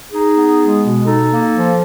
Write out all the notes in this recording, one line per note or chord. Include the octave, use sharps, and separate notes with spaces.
D#4 G#4
B3
G#3
B2
D#4 A4
A#3
F3